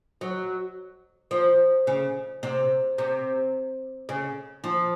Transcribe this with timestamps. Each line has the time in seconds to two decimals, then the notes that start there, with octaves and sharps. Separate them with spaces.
0.21 F#3
1.31 F3
1.87 C#3
2.43 C3
2.98 C3
4.09 C#3
4.64 F3